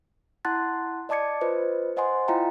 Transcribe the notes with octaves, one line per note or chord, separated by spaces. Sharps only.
E4 F#5 A5 C6 F#6 A6
D5 D#5 A5 D6 G#6 C#7
F4 B4 C5 D#5
C5 D#5 F#5 G#5 C6
E4 F4 D#5 F5 G5 A#5